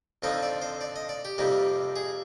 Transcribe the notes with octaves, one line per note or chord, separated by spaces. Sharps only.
F2 D3 F3 C4 D#4 D#5
D5
C5
D5
D#5
D5
G4
F2 C3 G3 A#3 D#4
G#4